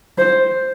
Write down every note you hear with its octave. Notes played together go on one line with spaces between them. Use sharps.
C5